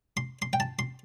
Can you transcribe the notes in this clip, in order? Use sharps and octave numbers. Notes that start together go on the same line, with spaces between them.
C6
C6
G5
A5
C6